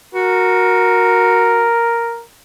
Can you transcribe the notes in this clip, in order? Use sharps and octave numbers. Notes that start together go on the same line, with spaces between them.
F#4 A#4